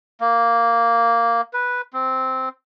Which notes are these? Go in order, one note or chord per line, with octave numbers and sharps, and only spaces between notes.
A#3
B4
C4